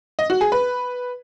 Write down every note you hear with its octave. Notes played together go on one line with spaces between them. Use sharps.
D#5
F#4
G#4
B4